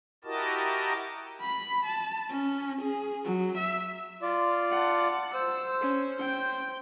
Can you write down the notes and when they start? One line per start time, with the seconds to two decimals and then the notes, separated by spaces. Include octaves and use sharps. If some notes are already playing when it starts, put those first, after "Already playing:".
0.24 E4 F#4 G4 A#4 D#5 A5
1.41 B5
1.86 A5
2.29 C#4
2.82 G#4
3.25 F#3
3.58 E5
4.22 F4 D5
4.71 F#5 A5
5.34 C5 E6
5.82 C#4
6.20 G5 G6